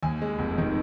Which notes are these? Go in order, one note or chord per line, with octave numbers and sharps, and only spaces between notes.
D#2 G#5
G#3
F1
D#3